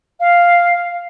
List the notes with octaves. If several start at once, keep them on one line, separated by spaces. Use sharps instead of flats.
F5